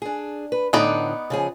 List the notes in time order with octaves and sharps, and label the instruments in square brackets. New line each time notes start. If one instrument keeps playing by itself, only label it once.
[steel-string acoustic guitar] D4 G#4
B4
[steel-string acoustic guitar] A2 D3 [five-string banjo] B3 D#4 D5
[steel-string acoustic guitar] C#3 F3 G#4